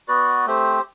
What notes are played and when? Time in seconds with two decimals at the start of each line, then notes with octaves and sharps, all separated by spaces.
0.08 B3 F#4 B4 D5
0.46 A3 C4 G4 C5